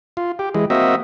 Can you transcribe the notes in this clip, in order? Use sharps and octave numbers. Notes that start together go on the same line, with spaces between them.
F4
G4
E3 G#3
A#3 C4 F#4 D#5 E5